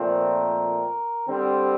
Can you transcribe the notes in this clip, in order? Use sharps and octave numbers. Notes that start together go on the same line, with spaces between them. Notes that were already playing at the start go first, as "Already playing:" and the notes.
Already playing: A#2 F3 A3 C4
A#4
D3 G3 C4